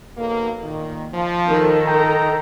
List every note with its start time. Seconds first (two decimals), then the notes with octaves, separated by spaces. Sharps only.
0.18 B1 A#3
0.63 A#2 D#3
1.13 F3
1.48 D#3 A4
1.86 D#5 G5 A#5